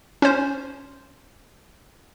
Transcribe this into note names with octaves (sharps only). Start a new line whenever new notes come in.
C#4 C5